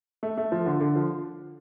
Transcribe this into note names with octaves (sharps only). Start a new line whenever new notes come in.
A3
A3
F3
D3
D3
F3